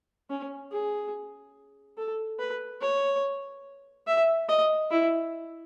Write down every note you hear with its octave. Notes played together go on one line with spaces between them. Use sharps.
C#4
G#4
A4
B4
C#5
E5
D#5
E4